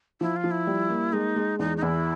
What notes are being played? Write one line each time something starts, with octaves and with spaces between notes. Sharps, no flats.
F3 E4
F4
F3
E4
G3
A#3
G#3 D#4
G#3
E2 D#4
D#4
E2 E4